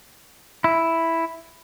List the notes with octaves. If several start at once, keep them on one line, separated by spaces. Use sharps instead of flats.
E4